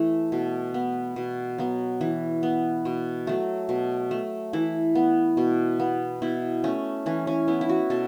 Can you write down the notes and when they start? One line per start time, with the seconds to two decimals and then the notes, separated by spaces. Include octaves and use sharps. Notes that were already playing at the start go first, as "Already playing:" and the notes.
Already playing: E3 A3 E4
0.32 B2
0.74 B3
1.16 B2
1.58 F#3 B3
2.01 E3
2.43 B3
2.85 B2
3.27 F#3 A3
3.69 B2
4.11 A3
4.53 E3 E4
4.95 B3
5.37 B2
5.80 B3
6.22 B2 E4
6.64 A3 C#4
7.06 E3 C#4
7.27 C#4
7.48 B3 E4
7.61 E4
7.69 F#4
7.90 B2 A4